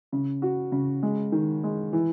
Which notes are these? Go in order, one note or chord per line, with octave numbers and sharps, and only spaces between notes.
C#3
F#4
C#3
G#3
D#3
G#3
E3